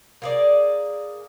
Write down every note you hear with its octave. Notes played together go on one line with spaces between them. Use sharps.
A#3 G#4 D5